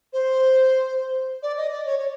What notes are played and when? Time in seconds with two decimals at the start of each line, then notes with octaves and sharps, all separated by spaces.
0.13 C5
1.43 D5
1.57 D#5
1.71 D5
1.85 C#5
1.99 C#5